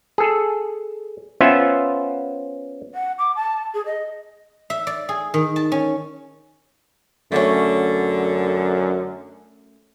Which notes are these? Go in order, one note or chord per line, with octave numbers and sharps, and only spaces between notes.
G#4 A4
B3 C#4 F4 C5 E5
F#5
D6
A5
G#4
D#5
E5
D5
G#4
D#3
A5
C#4
F#2 D3 A3 C#4